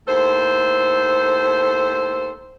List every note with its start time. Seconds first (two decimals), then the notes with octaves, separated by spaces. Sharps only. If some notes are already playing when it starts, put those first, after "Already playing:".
0.07 D#2 A2 A4 C5